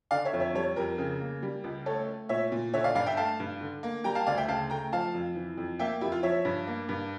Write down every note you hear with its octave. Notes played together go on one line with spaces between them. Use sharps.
D3 D5 F5
C#5 E5
F2
C#5 E5
G3 A4 C#5
F2 G4 A#4
C#3
A#3
G3
C#2
A3 A4 C#5
A3
A#2 C#5 E5
A#2
D3 C#5 E5
D5 F5
G2 D5 F5
E5 G5
A3 F5 A5
G2
D3
A#3
G3 G5 A#5
F5 A5
D2 D5 F5
E5 G5
C#3 F5 A5
A3 G5 A#5
F3 F5 A5
F2
E3
F2
A#3 E5 G5
F2 E4 G4
F4
F3 C#5 E5
G2
A#3
G2